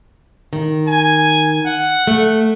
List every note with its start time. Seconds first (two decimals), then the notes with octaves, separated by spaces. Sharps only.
0.53 D#3
0.88 G#5
1.66 F#5
2.07 A3